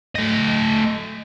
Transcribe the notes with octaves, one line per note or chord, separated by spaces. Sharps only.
A3 D#5